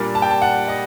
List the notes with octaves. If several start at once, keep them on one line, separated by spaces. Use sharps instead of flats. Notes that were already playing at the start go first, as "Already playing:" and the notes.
Already playing: A#2 G3 A#3 D4
A5
G5
A5
F#5
D#5